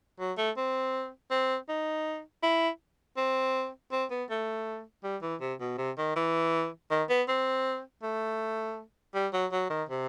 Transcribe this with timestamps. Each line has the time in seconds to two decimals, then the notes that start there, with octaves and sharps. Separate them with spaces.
0.20 F#3
0.37 A3
0.57 C4
1.31 C4
1.69 D#4
2.43 E4
3.17 C4
3.92 C4
4.11 B3
4.30 A3
5.04 G3
5.22 E3
5.41 C3
5.60 B2
5.78 C3
5.98 D#3
6.16 E3
6.90 D#3
7.09 B3
7.28 C4
8.03 A3
9.15 G3
9.33 F#3
9.52 F#3
9.70 D#3
9.89 C3